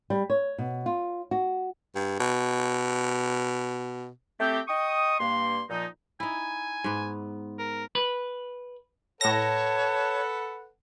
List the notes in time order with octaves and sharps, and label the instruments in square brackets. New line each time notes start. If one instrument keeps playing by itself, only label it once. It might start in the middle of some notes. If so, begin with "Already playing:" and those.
[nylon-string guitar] G3
C#5
B2
F4
F#4
[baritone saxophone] G2
B2
[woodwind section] A3 C4 G4
D#5 G5 C#6 D#6
G2 A#3 C6
A#2 F3 D#4
[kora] D#4 E4 [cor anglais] G#5
[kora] G#2 B3
[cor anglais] A#4
[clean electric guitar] B4
[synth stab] A2 A#6 [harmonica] A4 B4 F#5 [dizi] C#5 [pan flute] A5